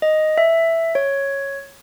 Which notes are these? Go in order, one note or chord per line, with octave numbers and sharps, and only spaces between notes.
D#5
E5
C#5